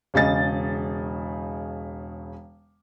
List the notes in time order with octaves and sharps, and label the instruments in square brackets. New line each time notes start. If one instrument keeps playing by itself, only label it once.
[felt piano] E1 C#3 D#5 A6